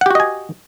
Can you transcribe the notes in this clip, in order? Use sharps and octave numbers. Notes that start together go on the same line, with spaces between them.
F#4 G4 D#5 F#5 G#5